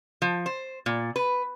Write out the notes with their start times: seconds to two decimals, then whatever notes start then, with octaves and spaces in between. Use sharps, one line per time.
0.22 F3
0.46 C5
0.86 A#2
1.16 B4